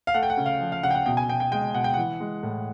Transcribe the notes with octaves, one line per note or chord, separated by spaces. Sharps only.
F5
A3 F#5
G5
F#5
C#3
F5
F3
F5
C#3 F#5
G5
F#5
B2 G5
G#5
B2 G5
G5
G#3 G5
B2 F#5
G5
E3 F#5
G#3
A2